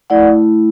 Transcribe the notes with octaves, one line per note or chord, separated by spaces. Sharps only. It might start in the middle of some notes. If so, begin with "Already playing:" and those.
A3 E4 D5 F#5